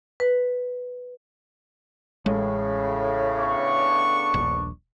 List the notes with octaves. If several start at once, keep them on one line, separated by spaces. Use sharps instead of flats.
B4
A1 A2 C#3 G#3
B3 D4 C#6
D#1 A#1